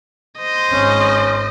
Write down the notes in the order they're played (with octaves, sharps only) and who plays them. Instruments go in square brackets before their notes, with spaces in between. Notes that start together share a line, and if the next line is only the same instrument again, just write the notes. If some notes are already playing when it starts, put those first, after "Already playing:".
[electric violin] C5 D#5
[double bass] G#1 C#4